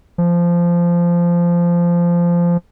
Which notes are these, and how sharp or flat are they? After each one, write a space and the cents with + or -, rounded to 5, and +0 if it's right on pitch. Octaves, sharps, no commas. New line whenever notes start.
F3 -15